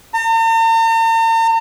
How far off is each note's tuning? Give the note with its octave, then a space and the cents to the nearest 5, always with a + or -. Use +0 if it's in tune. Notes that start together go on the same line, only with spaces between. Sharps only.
A#5 -45